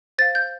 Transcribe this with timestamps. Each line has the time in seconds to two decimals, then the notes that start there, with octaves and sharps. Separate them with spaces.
0.18 C5 F5 A6
0.35 G6